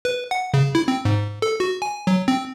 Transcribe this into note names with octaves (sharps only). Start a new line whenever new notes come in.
B4
F#5
C#3
E4
C4
G#2
A4
F#4
G#5
F#3
C4